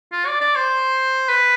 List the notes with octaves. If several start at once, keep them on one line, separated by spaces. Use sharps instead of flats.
F4
D5
D5
C5
B4